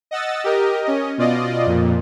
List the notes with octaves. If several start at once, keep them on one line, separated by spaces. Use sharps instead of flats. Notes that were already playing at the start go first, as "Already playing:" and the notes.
D#5 F#5 E6 A6
G4 A#4 D#5
C#4 D#5
B2 F4 D5 D#5
F2 A#2